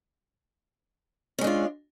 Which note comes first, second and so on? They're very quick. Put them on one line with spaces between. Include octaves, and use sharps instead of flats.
C#4 G#3 D4 F4